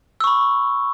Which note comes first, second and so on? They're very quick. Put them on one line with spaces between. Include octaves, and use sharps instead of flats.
E6 C#6 B5